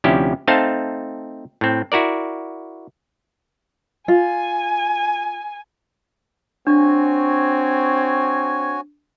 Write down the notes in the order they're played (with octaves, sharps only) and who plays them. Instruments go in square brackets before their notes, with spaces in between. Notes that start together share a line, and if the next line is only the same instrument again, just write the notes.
[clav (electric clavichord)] D2 C3 F3 C#4 E4 G4
A3 C4 D#4 C5 F5 A5
A2 C4
E4 F#4 A#4 D5
[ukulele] F4 [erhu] G#5
[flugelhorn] C4 [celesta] D4 [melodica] F#4 C#5 G#5